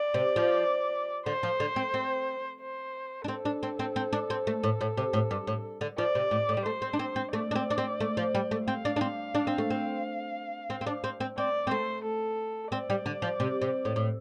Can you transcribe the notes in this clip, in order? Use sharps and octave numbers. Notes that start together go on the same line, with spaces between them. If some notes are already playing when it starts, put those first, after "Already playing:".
Already playing: D5
C3
F3
D3 C5
F3
D3
C4
C4
C5
D4
C4 A4
D4
C4
C4
C4
D4
C4
A3
A2
A2
C3
A2
G2
A2
D3
F3 D5
C3
A2
A2
G3
A3 C5
C4
D4
C4
C4
A3 D5
D4
C4
D4
C4
A3
F3
G3
A3
C4 F5
D4
D4
C4
D4
C4
A3
C4
C4
C4
D4
C4
C4
C4 D5
C4
A3 C5
A4
C4 D5
G3
D3
F3
C3
C3
A2
A2